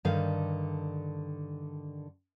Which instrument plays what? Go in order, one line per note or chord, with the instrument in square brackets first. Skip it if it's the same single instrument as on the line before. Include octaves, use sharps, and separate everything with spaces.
[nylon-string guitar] G2 D3 D#3 F5